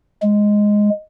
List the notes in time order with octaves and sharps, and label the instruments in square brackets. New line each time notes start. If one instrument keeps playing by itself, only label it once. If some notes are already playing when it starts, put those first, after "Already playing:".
[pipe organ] G#3